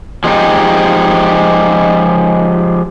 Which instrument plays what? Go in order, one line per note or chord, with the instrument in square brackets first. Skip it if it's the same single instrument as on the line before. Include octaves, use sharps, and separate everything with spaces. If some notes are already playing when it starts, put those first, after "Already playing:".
[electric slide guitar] F3 G#3 C4 D4 D#4 G4